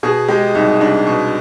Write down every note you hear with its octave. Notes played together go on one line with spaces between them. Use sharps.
B2 G#4
G#3 G4
C2 D#4
C2 D4
B2